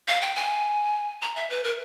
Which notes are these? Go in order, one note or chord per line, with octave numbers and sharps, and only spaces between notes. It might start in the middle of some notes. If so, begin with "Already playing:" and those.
F5
G5
G#5
A#5
E5
B4
A#4